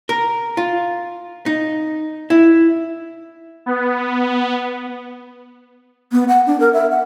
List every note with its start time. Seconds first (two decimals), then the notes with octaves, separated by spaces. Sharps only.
0.09 A#4
0.57 F4
1.46 D#4
2.30 E4
3.66 B3
6.12 B3
6.28 F#5
6.47 D4
6.60 A#4
6.73 E5
6.91 F#5